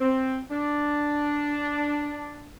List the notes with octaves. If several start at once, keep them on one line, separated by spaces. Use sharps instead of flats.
C4
D4